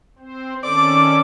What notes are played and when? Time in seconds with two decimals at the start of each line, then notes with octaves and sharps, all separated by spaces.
0.19 C4 C5
0.63 D#3 C#4 A4 D5 D6